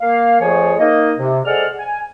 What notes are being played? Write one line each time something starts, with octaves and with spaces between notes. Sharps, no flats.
A#3 F5
F2 F3 A3 G#4 C#5 G#5
A#3 D#4 D#5
C3
G#3 A4 C5 D5 F#5 F6
G#5